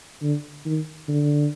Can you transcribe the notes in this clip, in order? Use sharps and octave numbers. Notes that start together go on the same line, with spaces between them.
D3
D#3
D3